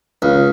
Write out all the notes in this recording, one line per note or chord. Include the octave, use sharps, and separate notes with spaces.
C#2